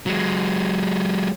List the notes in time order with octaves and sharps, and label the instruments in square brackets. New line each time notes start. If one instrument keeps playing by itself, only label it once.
[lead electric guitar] F#3 G#3